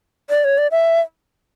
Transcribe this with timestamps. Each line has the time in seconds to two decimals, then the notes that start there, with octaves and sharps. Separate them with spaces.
0.30 D5
0.44 C#5
0.58 D5
0.71 E5